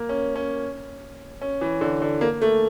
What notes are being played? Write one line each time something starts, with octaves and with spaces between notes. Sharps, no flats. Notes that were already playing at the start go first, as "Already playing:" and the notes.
Already playing: A#3
C#4
C#4
C#4
E3
D3
D3
A#3
A3